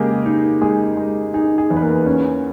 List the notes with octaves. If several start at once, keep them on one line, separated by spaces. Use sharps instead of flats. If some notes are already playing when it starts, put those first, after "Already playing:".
Already playing: C#3 G#3 A#3 G4 G#4 A#4
D#4
G#3 G#4
G#3
D#4 G#4
G#4
E2
B4
A#3 A#4
C#4